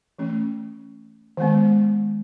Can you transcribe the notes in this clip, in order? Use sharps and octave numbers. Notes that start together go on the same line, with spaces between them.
E3 A3 C#4
D#3 G#3 B3